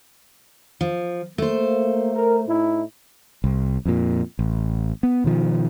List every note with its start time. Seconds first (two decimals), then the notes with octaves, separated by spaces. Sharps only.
0.81 F3
1.38 A3 A#3 C5
2.14 A#4
2.47 A2 D#4 E4
3.44 C2
3.86 F2 A#2
4.39 A1
5.03 B3
5.24 B2 D#3 F3